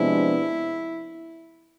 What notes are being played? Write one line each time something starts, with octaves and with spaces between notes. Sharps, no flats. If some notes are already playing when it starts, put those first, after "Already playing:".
Already playing: C3 F3 G#3 B3 D4 E4